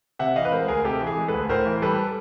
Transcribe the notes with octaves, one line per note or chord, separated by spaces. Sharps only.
C3 E5 F#5
E3 D#5 F5
B4
G#3 A#4 C5
D2 G#4 A#4
C3 G4 A4
E3
G#4
G#3
A4 B4
D2
A2 A#4 C5
E3
G3 A4 B4